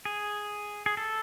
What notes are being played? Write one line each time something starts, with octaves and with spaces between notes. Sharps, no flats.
G#4
G#4
A4